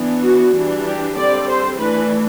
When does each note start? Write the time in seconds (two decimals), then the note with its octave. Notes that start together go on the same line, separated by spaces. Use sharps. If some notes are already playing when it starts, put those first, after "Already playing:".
Already playing: E3 B3 D4
0.22 F#4
0.53 E3 G3 D4
0.85 G4
1.16 D3 G3 C4 D5
1.48 C5
1.79 E3 A3 D4 B4